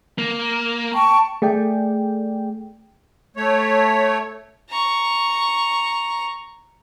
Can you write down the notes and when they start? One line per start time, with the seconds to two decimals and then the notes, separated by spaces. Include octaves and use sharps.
0.18 A#3
0.94 G5 A5 C#6
1.42 A3 G#4 D5 G5
3.36 A3 C#5
4.70 A#5 C#6